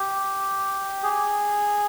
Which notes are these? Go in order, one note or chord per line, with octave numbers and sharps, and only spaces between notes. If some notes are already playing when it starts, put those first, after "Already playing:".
Already playing: G4
G#4